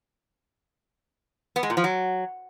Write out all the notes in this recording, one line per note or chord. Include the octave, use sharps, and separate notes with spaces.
B3
G#3
A#2
F3
F#3